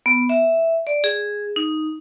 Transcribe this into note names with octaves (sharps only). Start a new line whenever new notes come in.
B3
E5
D5
G#4
D#4